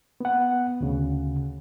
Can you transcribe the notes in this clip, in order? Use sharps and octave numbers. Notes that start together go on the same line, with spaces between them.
B3 F#5
D2 C#3